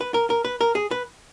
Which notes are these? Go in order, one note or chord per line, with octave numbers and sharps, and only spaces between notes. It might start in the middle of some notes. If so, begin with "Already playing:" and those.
B4
A#4
A#4
B4
A#4
G#4
B4